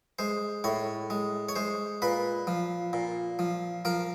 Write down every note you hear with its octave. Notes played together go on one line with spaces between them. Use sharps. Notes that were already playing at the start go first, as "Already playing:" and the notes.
G#3 C5
A2 C#5
G#3
C#5
G#3 C5
A#2 B4
F3
A#2
F3
F3 A#4